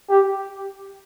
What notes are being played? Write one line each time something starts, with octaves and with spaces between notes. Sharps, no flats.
G4